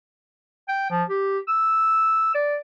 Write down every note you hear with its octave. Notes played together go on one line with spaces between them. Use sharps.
G5
F3
G4
E6
D5